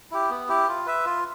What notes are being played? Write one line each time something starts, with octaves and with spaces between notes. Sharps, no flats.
E4 G4
B3
E4 G4
F4
B4 E5
F4